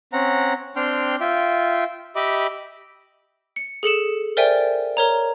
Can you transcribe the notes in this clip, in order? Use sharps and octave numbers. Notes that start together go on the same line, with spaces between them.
C4 C#4 F#5 A#5
C4 D4 G5 C6 F6
F4 E5 G5
G4 D#5 E5 B5 D6
C#7
G#4 A4 C#7 E7
A#4 C5 D5 E5 G5 G#5
A#4 C#5 A#5